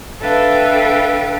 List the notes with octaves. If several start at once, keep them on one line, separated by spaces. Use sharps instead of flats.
D4 A4 B4 E5 F5 G5